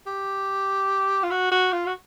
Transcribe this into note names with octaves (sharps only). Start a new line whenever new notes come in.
G4
F4
F#4
F#4
F4
F#4